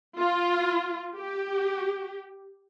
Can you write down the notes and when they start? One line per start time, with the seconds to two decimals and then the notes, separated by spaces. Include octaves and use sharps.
0.19 F4
1.15 G4